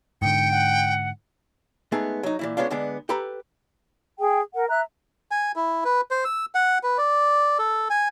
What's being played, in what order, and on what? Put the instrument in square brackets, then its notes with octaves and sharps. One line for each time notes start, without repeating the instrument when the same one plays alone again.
[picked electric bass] G#2 D3 [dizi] G5 [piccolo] C#7
[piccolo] F#5
[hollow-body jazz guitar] G#3 A3 B3 D#4 G#4
F#3 D#4
A#2 E3 E4
G#3 B3 C#4 D4 F4
D3 G#3 B3 D4
G4 A4 B4 A#5 B5
[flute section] G#4 G5
A#4 F#5
E5 A#5 F#6
[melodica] G#5
E4
B4
C5
E6
F#5
B4
D5
A4
G#5